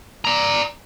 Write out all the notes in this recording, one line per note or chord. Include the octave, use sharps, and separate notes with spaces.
D5 A#5